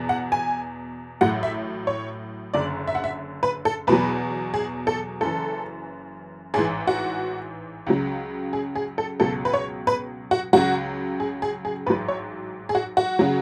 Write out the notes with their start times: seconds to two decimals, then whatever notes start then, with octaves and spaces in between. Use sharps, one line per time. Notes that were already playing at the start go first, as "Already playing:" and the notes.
Already playing: E2 B2
0.09 F#5
0.32 G#5
1.21 A1 A2 F#3 F#5
1.43 E5
1.87 C#5
2.54 F#1 F#2 D3 D5
2.87 E5
2.95 F#5
3.04 E5
3.43 B4
3.65 A4
3.87 E2 B2 F#3 B4
4.54 G#4
4.87 A4
5.21 F#1 F#2 E3 A4
6.54 A1 G#2 E3 G#4
6.87 F#4
7.87 C#2 C#3 F#3
8.53 G#4
8.76 G#4
8.98 A4
9.20 C#2 B2 F#3 A4
9.45 B4
9.54 C#5
9.87 B4
10.31 F#4
10.53 C#2 C#3 F#3 F#4
11.20 G#4
11.42 G#4
11.65 G#4
11.86 A1 G#2 F#3 B4
12.08 C#5
12.69 G#4
12.75 F#4
12.97 F#4
13.19 C#3 F#3